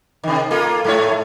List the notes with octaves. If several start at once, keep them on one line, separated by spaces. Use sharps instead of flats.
C3 D#3
A#3 F4 A4
G#2 A3 C#5